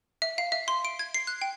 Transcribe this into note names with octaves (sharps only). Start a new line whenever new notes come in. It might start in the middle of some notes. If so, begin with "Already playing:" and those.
E5
F5
E5
C6
D7
G#6
C7
F#6
G5